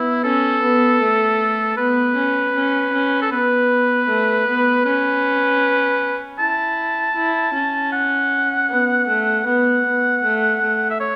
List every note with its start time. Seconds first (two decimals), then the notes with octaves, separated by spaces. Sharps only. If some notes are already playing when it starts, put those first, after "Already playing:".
Already playing: B3 E4
0.23 C#4 A4
0.62 B3
1.01 A3
1.77 B3 B4
2.15 C#4
2.55 C#4
2.93 C#4
3.22 A4
3.31 B3 B4
4.08 A3
4.47 B3
4.85 C#4 B4
6.39 E4 A5
7.16 E4
7.54 C#4
7.92 F#5
8.69 B3
9.08 A3
9.46 B3 F#5
9.85 B3
10.24 A3
10.62 A3
10.90 E5
11.00 C#5